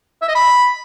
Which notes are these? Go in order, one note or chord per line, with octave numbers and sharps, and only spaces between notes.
E5
D#5
B5